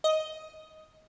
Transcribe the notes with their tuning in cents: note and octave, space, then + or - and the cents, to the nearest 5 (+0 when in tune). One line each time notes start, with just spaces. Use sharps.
D#5 +5